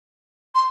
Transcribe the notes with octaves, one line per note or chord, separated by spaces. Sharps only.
C6